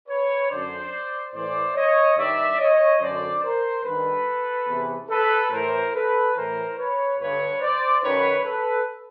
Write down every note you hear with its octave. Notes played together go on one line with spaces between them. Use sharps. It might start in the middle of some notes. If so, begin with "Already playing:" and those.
B4 C#5
F#2 D3 C5 D5
A2 E3 C5 D5
C#5 D#5
G2 D#3 D5 E5
C#5 D#5
F#2 D3 C5 D5
A#4 C5
G2 D#3 A4 B4
E2 C3 E3
A4 B4
A2 E3 A#4 C5
A4 B4
A2 E3 A#4 C5
B4 C#5
G2 D3 B4 C#5
C5 D5
F#2 D#3 B4 C#5
A4 B4